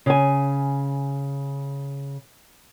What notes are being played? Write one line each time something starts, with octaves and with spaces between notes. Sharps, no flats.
C#3 G#5